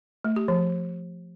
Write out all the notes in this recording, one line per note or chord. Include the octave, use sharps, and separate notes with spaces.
A3
G4
F3